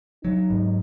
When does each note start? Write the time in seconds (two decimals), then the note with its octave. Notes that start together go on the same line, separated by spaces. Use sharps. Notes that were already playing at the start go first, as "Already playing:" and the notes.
0.24 F#3 D#4
0.50 G#2